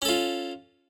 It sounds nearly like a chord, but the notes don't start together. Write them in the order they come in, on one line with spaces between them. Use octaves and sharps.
C#4 A4 F4